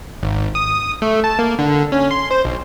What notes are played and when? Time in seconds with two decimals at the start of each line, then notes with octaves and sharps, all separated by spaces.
0.23 G#1
0.55 D#6
1.02 A3
1.24 A5
1.39 A#3
1.59 D3
1.92 C#4
2.11 C6
2.31 C5
2.45 B1